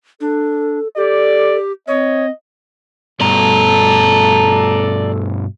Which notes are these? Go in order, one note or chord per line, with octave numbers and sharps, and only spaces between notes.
D4 A4
G4 A4 D5
C4 C#5 D#5
G2 B2 A4 D5 A#5